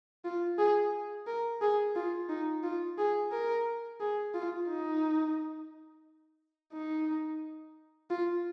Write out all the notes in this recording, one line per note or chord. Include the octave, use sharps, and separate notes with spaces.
F4
G#4
A#4
G#4
F4
D#4
F4
G#4
A#4
G#4
F4
D#4
D#4
F4